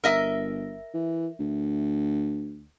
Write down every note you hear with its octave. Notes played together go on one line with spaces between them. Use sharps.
G1 A#4 D#5 E5
E3
D2